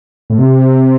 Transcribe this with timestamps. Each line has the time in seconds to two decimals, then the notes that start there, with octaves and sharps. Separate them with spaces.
0.30 A2
0.38 C3